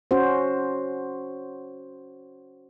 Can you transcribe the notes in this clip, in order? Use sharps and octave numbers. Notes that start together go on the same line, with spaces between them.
C#4 F#4 C5